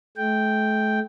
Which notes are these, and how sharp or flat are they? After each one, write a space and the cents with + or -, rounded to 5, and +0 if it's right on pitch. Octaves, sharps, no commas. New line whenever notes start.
A3 -40 G5 +0